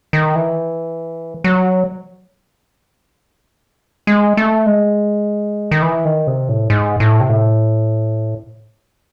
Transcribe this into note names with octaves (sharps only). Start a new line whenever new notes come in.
D#3
E3
F#3
G#3
A3
G#3
D#3
E3
D#3
C3
A2
G#2
A2
C3
A2